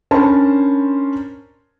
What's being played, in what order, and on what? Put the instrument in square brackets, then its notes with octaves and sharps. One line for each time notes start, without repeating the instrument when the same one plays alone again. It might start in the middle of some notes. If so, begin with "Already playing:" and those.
[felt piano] C#4 D4 A#4 C5 A5 B5